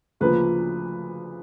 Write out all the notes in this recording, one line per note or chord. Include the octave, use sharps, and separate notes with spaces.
D2 C#3 F3 A#3 B4